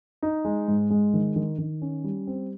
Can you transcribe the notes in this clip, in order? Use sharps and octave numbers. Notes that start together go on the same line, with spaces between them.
D#4
G#3
G#2
G#3
D#3
D#3
D#3
C#4
G3
C4